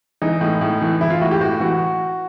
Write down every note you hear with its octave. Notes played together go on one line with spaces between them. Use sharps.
E3 D#4
A2
A2
E3
E3 E4
F4
A2 F#4
G4
A2 F#4
E3 F#4